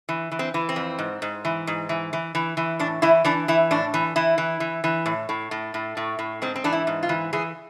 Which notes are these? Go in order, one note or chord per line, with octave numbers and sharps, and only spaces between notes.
E3
E3
C4
E3
C4
F2
G#2
G#2
E3
G#2
E3
E3
E3
E3
A2 D4
E3 E4
E3 D4
E3 E4
A2 D4
E3
E3 E4
E3
E3
E3
A2
A2
A2
A2
A2
A2
G#2 C4
C4
E3 D4
E4
G#2
F4
E3
E3 G#4